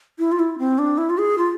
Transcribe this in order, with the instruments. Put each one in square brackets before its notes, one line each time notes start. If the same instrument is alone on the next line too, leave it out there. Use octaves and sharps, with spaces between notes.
[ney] E4
F4
E4
C4
D4
E4
F4
G#4
F4